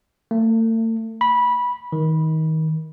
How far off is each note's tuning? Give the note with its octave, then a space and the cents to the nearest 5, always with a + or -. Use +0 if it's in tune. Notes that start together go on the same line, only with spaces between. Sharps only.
A3 +40
B5 -15
D#3 +25